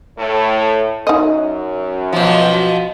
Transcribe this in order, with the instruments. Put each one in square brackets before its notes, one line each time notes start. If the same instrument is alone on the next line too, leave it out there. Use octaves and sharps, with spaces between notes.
[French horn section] A2
[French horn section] F#2 [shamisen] D#4 D#5
[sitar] B2 F3